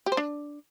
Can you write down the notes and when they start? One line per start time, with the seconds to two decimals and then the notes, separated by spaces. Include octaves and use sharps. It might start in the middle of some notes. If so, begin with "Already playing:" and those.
0.06 G4
0.12 C5
0.17 D4